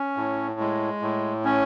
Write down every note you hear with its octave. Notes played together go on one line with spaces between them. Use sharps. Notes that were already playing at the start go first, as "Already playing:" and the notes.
Already playing: C#4
A2
G#3
A2
C#4